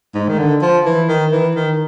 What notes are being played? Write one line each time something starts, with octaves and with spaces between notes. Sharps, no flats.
G#2
D#3
D3
F3
E3
D#3
E3
D#3